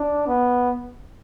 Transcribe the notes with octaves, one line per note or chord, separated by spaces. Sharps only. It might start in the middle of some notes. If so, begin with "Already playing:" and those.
Already playing: D4
B3